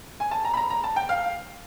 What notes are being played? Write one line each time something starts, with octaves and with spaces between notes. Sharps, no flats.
G#5
A5
A#5
B5
A#5
A#5
A5
G5
F5